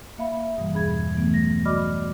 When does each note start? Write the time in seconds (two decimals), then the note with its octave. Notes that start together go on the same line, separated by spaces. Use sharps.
0.18 A#3 E5 F5 B5
0.57 G2 B2 E3 G3
0.72 E2 C#4 G#4 B5 G#6
1.14 E3 F#3 A3 B3
1.34 A#6
1.65 F#4 D5 D#5 B5 D6 F6